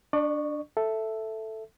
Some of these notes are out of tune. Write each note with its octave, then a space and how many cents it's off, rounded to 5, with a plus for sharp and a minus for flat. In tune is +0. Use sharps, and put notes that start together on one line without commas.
D4 +0 D5 +40 C#6 +0
A4 +0 E5 +0